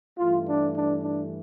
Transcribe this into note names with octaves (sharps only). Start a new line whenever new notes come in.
G2 E3 A3 F4
D4
D4
D4